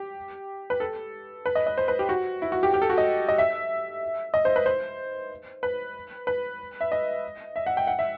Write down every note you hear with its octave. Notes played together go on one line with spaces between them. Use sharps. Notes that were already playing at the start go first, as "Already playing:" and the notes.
Already playing: G4
B4
A4
B4
D#5
D#5
C5
B4
G4
F#4
E4
F#4
G4
G4
A4
F#4
D#5
D#5
E5
D#5
C5
B4
C5
B4
B4
E5
D#5
E5
F#5
G5
F#5
E5